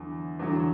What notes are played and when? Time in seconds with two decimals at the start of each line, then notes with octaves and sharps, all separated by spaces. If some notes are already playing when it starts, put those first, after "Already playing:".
Already playing: E2 D3 F#3
0.39 E2 D3 F#3